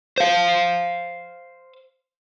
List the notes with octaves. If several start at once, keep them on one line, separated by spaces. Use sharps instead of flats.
C5 F5